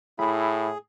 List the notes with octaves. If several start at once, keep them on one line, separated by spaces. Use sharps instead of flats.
A2 E4 G#4 B5